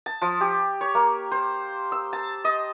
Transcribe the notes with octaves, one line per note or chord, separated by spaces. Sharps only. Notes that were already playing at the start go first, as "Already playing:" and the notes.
A5
F3
G4
C#5
A#3
C5
E6
A5
D#5